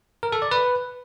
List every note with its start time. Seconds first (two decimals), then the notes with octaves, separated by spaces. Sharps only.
0.23 A#4
0.32 A4
0.42 D5
0.51 B4